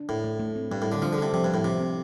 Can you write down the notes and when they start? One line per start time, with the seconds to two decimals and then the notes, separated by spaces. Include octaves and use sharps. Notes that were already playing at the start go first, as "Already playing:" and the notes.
Already playing: D4
0.09 A2 A3
0.24 A3
0.40 A3
0.56 C4
0.71 G2 G3
0.82 A2 G3
0.92 D3
1.02 F3 D4
1.13 D3
1.18 C3 A4
1.33 C3 F3
1.44 G2
1.50 A2 F3
1.64 C3 F3
1.80 C4